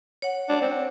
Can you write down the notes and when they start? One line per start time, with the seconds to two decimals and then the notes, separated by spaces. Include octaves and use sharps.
0.22 C#5 F#5
0.49 D4
0.62 C4